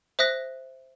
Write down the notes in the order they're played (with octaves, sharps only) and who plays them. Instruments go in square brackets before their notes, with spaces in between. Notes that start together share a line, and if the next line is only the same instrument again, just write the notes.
[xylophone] C5 E5 D#6 F#6 A#6